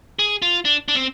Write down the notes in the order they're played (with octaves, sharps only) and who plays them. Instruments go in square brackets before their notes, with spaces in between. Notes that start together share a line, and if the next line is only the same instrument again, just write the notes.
[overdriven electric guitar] G#4
F4
D4
D4
C4